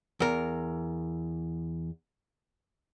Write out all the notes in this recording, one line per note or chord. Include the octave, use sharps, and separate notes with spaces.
E2 A#4